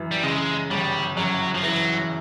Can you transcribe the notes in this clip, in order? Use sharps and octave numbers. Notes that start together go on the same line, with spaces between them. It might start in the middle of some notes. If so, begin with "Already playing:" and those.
Already playing: F#2 E3
G3
C#3 G#3
G1 G3
F#2 F#3
F3
E3 F#3